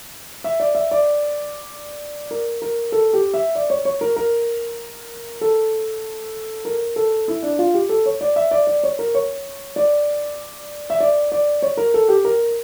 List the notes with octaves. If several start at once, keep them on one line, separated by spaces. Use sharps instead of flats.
E5
D5
E5
D5
A#4
A#4
A4
G4
E5
D5
C#5
C#5
A#4
A#4
A4
A#4
A4
E4
D4
F4
G4
A4
C#5
D5
E5
D5
D5
C#5
A#4
C#5
D5
E5
D5
D5
C#5
A#4
A4
G4
A#4